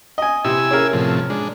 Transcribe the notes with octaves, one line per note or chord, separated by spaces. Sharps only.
D#5 G#5
C3 E4 G#5 E6
C#4 G#4 A#4
A2 C3 F3
G#3 D4